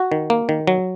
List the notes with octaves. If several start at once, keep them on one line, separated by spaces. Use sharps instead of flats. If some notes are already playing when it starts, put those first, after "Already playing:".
Already playing: F#4
D#3
A#3
D#3
F#3